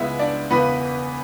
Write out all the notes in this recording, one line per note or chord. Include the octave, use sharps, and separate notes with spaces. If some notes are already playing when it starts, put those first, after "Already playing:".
Already playing: C#2 C#3 G#3 B3 E4 E5
D4 D5
E1 E2 C#3 E3 B3 B4